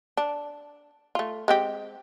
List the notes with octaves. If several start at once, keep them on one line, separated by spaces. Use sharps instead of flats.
D4
A3 F4
G#3 C4 G4